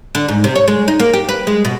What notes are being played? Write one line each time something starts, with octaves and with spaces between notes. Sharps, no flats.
D3
G#2
C3
C#5
G#3
D#4
A#3
G4
B4
G#3
B2